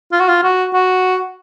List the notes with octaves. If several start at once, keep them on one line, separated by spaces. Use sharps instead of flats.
F4
F#4
F4
F#4
F#4